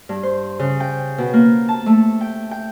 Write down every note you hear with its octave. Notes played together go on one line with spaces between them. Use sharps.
G2
C5
C#3
G5
B2
A#3
A5
A3
G5
G5